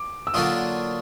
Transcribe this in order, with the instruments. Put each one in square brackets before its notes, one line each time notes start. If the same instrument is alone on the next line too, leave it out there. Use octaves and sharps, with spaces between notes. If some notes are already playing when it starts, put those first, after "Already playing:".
Already playing: [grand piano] D6
E6
[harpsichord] D3 F#3 A#3 D4 F4 [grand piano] D#6